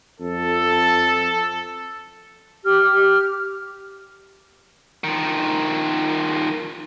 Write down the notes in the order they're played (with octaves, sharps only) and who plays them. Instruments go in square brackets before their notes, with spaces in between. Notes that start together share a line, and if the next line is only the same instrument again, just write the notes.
[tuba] F2 [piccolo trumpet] A4
[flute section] G4 F6
[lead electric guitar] D#3 F3